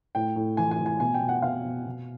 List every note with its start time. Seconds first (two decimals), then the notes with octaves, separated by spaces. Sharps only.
0.15 A2 G5
0.36 A2
0.57 E3 G#5
0.71 G#5
0.79 E3
0.86 G#5
1.00 B2 G#5
1.14 G5
1.21 B2
1.29 F#5
1.42 B2 F5
1.65 B2
1.86 B2